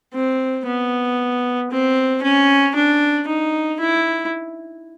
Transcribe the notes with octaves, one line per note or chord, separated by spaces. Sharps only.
C4
B3
C4
C#4
D4
D#4
E4